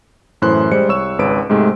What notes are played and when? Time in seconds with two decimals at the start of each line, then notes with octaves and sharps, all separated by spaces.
0.42 F#2 A2 E3 C5 C6 F#6
0.72 G3 G#3 C5 C#7
0.88 C2 C#5 C#6 E6 E7
1.19 G#1 C#2 B4 C#5 D7
1.50 G#2 C3 G#3 A3